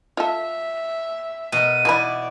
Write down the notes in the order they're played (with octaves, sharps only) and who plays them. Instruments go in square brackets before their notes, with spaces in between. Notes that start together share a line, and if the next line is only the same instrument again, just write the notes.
[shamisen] F4 A4 [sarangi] E5
[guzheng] B2 A#4 [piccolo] D#7
[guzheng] B2 E4 [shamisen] E3 F#4 B5 [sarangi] D5